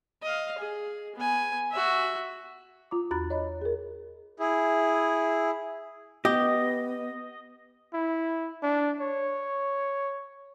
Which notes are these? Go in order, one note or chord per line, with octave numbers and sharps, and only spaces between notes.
D#5 F5
G#4
B3 G#5
F#4 E5
F4 A#5 D6
E2 F#4 A#5 B5 F#6 A6
C#5 D#5 B5
G#4 A#4
E4 G#4
B3 G4 D#5
E4
D4
C#5